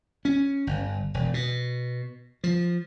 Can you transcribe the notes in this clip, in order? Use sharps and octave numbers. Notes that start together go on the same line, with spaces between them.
C#4
G1
E1
B2
F3